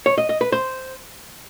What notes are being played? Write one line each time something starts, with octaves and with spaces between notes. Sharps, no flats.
C#5
D#5
D#5
B4
C5